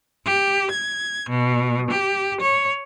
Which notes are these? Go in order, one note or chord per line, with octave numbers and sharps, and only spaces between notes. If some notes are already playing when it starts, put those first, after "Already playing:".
G4
G#6
B2
G4
C#5